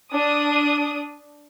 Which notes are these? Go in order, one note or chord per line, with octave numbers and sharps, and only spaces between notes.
D4 D#6